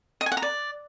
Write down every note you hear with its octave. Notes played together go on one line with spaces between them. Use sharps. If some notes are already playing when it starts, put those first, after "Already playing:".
D#5
G#5
F#5
A#5
D5